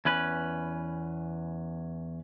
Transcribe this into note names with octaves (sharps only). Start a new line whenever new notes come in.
E2 C#4 B4